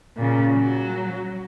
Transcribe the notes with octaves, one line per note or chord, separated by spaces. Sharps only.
A#2 C#3
F#3